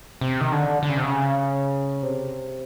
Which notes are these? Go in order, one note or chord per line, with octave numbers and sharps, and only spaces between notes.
C3
D#3
D3
D3
C#3
C3
C#3
C3